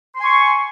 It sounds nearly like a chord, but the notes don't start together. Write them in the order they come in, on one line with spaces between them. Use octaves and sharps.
C6 G#5 C#6